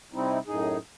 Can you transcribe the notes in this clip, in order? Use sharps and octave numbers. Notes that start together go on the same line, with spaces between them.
C3 G3 C4 D#4 E4
F#2 A2 D#4 G#4